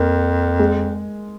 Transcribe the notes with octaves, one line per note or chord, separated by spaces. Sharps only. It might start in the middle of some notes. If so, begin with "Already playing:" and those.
Already playing: F2 A#3
G#3